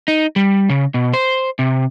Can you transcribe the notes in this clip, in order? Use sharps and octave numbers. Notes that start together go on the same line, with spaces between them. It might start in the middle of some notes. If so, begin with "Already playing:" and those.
D#4
G3
C#3
B2
C5
C3